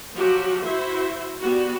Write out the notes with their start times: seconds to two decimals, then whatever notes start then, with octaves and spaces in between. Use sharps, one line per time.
0.14 F3 F#3 F#4 G4
0.65 E4 F#4 C5 E5
1.42 G3 B3 F#4